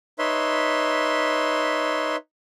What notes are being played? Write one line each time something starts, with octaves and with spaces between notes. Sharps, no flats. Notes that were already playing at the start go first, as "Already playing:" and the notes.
D#4 B4 C#5 E5 C6